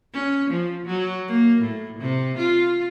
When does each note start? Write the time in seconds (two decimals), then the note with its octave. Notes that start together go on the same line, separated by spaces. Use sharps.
0.14 C#4
0.50 F3
0.86 F#3
1.28 A#3
1.61 A2
1.99 C3
2.38 F4